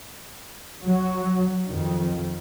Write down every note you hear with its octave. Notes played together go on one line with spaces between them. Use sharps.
F#3
F2 D#3